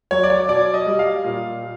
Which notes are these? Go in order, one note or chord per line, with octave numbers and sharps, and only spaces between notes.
F#3 C#5
D5
C#5
B2 D5
D#5
G3
F5
A#2